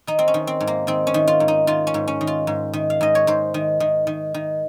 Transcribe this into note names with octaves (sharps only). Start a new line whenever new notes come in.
D#3 D#4
C4
C#4
D#3
C4
G#2
A#3
D#3 C4
C#4
D#3
F4
G#2
D#4
D#3 F4
C#4
G#2
C#4
D#3
F4
G#2
D#3
F5
G#2 D#5
C#5
G#2 C5
D#3
D#3
D#3
D#3